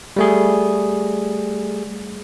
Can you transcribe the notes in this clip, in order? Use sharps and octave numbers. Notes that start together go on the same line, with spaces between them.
G3 A3 G#4